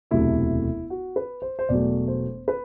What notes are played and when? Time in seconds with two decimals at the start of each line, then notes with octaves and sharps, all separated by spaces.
0.11 E1 D2 C3 F#3 A3 E4
0.90 F#4
1.16 B4
1.42 C5
1.59 C5
1.69 E1 E2 B2 F#3 A3 D5
2.08 C5
2.48 B4